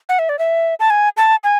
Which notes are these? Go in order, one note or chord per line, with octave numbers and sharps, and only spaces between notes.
F#5
E5
D5
E5
A5
G#5
A5
G#5